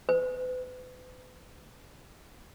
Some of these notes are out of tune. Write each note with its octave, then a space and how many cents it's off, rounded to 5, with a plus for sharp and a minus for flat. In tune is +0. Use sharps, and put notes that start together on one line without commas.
B4 +40